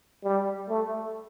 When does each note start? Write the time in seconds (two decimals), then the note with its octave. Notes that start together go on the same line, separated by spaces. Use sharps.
0.24 G3
0.68 A3